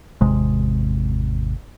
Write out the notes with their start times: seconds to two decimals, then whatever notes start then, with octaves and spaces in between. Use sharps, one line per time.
0.21 G#1 E2 C3 G#3